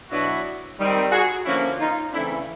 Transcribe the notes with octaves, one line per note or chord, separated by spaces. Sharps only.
B2 F#3 B3 D4 E4 F#4
D#3 G3 C4
F#4 G#4
D3 F3 A#3 C#4 E4 F#4
D#4 F4
C#3 E3 A3 C4 D4 E4